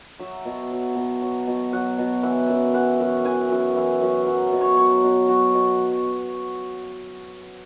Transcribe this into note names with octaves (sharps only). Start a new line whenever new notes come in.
F#3 E5
B2
F#3
B2
F#3
B2
F#3 F#5
B2
E3 F#5
F#2
E3 F#5
F#2
E3 G#5
F#2
E3
F#2
F#3 F#5
B2
C#5
F#3 C#5
B2
F#3 F#4
B2